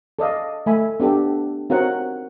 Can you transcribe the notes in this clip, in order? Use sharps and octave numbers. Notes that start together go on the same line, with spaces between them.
A4 D5 D#5 F5
A3 A4 E5 G#5 B5
B3 D4 G4 A4
C4 D#4 F#4 A#4 C#5 F#5